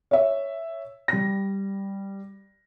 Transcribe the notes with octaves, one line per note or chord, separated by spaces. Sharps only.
C#5 E5
G3 A#6